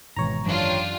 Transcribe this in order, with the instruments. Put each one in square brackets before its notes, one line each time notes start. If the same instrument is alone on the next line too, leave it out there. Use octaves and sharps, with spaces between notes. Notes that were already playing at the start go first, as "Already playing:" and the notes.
[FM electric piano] G#1 C#5 A#5 [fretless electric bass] G#2 B2 E3
[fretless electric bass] F#2 E3 F#3 [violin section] D4 F4 G4